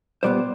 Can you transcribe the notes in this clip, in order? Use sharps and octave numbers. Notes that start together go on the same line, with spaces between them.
A#2 G3 B3 C5 D5